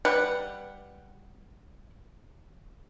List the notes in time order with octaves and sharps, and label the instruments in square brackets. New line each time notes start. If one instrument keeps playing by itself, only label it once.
[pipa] G3 B4 F#5